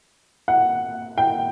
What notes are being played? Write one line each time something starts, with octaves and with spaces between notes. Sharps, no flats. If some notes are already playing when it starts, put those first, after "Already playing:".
F#5
G5